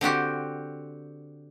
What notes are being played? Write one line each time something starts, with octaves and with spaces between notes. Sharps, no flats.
D3 C4 F#4 G4